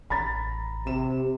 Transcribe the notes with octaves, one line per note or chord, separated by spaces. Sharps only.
A1 A#5 B5 A6
C3 E7